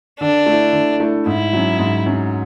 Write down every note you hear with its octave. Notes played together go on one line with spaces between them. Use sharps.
D3 D4
A3
E4
D3
A3 E4
G#2 E4
F#3 C#4
G#2
F#3 C#4